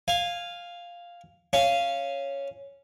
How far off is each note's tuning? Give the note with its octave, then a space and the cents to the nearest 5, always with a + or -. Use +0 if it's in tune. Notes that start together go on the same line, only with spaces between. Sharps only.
F5 +0 G#5 -15
C#4 +0 F5 -15